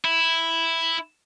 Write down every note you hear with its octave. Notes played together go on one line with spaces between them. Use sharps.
E4